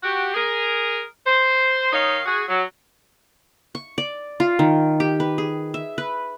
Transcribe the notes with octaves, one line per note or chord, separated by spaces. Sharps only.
F#4 G4
G#4 A#4
C5
D#3 D#4 C#5 F5
F#4 G#4
F#3
C#6
D5
F4
D#3
G4
B4
G#4
E5
B4